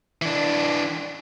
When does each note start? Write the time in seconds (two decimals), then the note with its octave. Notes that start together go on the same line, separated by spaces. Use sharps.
0.22 E3 D4